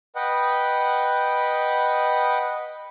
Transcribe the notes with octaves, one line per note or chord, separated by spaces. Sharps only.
B4 D#5 F#5 G5